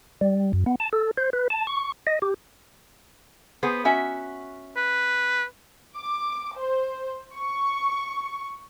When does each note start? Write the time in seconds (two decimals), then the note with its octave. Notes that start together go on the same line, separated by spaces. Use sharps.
0.21 G3
0.53 F#2
0.66 B3
0.80 A5
0.93 A4
1.17 C5
1.33 B4
1.50 A5
1.67 C#6
2.07 D#5
2.22 G4
3.63 B3 G#4 C5
3.85 C#4 F#4 E5
4.76 B4
5.97 D6
6.57 C5
7.36 C#6